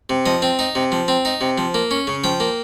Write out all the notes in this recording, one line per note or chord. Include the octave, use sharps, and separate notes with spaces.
C3
F3 D#5
C4
D#4
C3
F3
C4
D#4
C3
F3
A#3
C#4
C#3
F3 G5
A#3